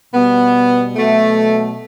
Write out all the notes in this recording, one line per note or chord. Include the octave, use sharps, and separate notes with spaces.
B2 G3 B3
B2 F#3 A3